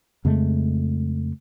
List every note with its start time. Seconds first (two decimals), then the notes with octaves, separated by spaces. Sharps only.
0.25 F2 C#3 G#3 A3